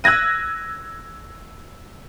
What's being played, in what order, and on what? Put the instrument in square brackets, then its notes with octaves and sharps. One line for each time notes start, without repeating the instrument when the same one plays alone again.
[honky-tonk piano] E6 F#6 G#6 A#6 D#7